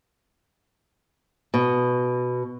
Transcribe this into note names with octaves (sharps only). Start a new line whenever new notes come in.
B2